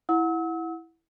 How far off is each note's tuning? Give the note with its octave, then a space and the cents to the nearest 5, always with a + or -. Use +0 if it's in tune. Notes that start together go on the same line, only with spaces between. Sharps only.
E4 +0 F#5 -20 E6 -40